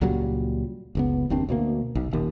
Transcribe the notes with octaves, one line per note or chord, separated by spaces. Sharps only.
C#2 A#2 F#3 G3
F#1 C#2 B3
F#1 D#2 C4 D4
D2 B2 A#3
B1
D#1 D#2